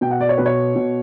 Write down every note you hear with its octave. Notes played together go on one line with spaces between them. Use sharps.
B2 G5
F#5
D5
C#5
B2 B4
C#5
B2